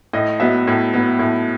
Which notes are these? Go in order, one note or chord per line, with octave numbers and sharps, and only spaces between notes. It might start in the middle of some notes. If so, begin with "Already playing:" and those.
A2 D#5
F#3 B3 E5
A2
F#3 B3
A2